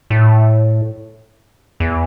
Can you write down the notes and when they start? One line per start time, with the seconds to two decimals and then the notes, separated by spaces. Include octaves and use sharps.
0.10 A2
1.80 E2